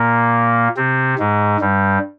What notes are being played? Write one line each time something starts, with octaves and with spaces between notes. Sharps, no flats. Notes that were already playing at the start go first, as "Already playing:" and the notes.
Already playing: A#2 A#3
C3 C4
G#2 G#3
G2 G3